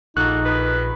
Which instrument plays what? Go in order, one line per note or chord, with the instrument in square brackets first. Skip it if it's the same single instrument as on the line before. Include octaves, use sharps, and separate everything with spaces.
[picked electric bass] A#1 [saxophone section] A#3 F#4 A4 [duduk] D#4 [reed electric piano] F#6
[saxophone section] D#3 B4